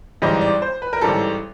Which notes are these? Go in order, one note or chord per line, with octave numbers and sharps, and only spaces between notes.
A1 G#2 E3 G3 D#5
D5
C5
B4
A#4
A1 G#2 E3 G3 A4